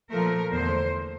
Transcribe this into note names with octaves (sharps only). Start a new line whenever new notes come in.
A#2 F3 A3 A#4
E2 D3 A3 C5